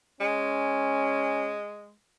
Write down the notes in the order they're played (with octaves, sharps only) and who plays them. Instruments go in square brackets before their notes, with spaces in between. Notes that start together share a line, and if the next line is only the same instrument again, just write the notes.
[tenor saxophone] G#3 [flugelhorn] C#4